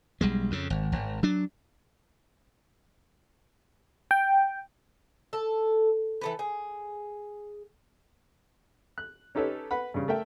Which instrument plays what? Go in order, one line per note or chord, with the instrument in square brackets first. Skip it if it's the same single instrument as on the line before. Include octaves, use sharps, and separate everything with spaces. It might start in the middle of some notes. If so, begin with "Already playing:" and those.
[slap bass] B1 G3 G#3
F2 C#3
G#1
G#1
F#3 D4
[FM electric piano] G5
[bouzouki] A4
E3 A4 B4
G#4
[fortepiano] F#6
C#4 D#4 G4 A4 B4 C#5
B4 F#5 B5
G2 C#3
A3 A#4 E5 G5